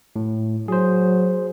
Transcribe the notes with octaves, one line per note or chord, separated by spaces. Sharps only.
A2
F#3 G#4 C5